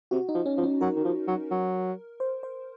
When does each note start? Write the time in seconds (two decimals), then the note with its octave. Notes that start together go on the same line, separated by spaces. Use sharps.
0.11 C3 F#4
0.29 D#4
0.35 F3
0.46 C#4
0.58 F3
0.63 C#4
0.81 F#3 A#4
0.96 D#3
1.04 F3
1.28 F#3
1.51 F#3
2.20 C5
2.43 C5